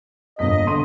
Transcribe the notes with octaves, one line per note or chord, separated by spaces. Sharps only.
G1 A#2 D#5 B6
D3 C6 D#7